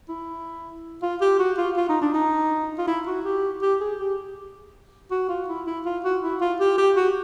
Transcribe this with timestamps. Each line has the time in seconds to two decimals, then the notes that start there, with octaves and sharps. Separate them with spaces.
0.09 E4
1.03 F4
1.21 G4
1.39 F#4
1.57 F4
1.77 F4
1.89 D#4
2.01 D4
2.14 D#4
2.78 F4
2.87 E4
3.07 F#4
3.25 G4
3.62 G4
3.81 G#4
3.99 G4
5.11 F#4
5.29 F4
5.48 E4
5.67 E4
5.85 F4
6.04 F#4
6.22 E4
6.41 F4
6.60 G4
6.78 G4
6.96 F#4